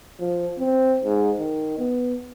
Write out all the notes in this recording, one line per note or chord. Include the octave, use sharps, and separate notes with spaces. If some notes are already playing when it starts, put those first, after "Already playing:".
F3
C4
G#2
D#3
B3